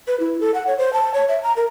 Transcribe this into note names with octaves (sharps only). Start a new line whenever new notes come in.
B4
E4
A4
F#5
C#5
C5
A5
C#5
E5
A#5
A#4